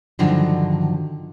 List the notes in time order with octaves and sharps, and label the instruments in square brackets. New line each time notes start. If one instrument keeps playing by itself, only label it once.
[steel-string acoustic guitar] G2 D3 D#3 F3 F#3